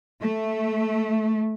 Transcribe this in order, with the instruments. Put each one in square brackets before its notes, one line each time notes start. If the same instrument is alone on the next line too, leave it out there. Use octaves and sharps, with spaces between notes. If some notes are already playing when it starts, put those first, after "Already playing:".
[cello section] A3